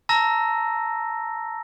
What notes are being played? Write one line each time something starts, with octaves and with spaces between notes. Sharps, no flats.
A5 A#5 E6 A#6